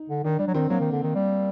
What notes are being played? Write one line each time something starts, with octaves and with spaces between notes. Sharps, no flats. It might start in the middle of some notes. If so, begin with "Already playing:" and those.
Already playing: D#4
D3
D#3 D4
G3 D4
F#3
D#3 C4
F#3 A#3
D#3
D3
D#3
G3